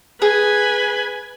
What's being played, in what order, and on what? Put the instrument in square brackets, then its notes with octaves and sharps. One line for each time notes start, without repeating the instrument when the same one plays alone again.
[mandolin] G#4 [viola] B4 G#5